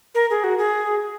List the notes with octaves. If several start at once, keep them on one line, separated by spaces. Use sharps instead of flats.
A#4
G#4
F#4
G#4